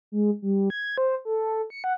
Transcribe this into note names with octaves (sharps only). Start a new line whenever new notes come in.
G#3
G3
G#6
C5
A4
C#7
F#5